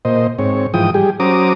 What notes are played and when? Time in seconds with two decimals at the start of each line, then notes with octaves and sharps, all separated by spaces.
0.05 A#2 C5 D#5
0.39 G#2 C4 C#5
0.74 G#2 E3 F3 G5 D#6
0.94 G3 G4 G#4
1.20 F#3 C#4 C5 A#5 D6 D#6